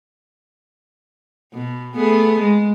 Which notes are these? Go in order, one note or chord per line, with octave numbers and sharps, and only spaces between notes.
B2
A3 B3 G#4
G#3